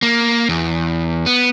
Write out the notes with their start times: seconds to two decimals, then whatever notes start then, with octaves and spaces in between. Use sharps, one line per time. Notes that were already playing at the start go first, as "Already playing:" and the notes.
0.02 A#3
0.49 E2
1.26 B3